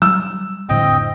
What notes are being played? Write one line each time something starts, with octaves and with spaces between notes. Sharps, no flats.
F#3 G3 E6
F1 A2 D3 C4 D#5 G5